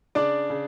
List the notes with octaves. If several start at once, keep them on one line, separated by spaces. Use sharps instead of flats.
C#3 D4 D5
C#3